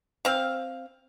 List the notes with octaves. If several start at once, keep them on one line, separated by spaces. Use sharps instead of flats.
C4 F5